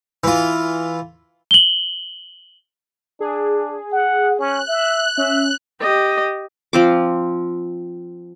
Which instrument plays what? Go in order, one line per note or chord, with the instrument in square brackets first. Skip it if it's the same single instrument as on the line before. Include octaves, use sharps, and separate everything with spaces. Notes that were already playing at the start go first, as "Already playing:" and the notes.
[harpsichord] E3 F4
[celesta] F#7 G7
[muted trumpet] D4 [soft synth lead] G#4
[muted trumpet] F#5
[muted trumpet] C#4 [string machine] F#6
[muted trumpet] E5
[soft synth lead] C#4 [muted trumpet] E5
[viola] G4 D#5
[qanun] F3 C4 D6